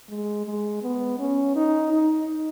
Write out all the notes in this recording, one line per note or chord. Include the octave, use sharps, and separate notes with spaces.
G#3
G#3
B3
C#4
D#4
D#4